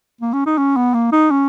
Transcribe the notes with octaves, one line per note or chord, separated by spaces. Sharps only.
A#3
C#4
D#4
C#4
B3
A#3
D#4
C#4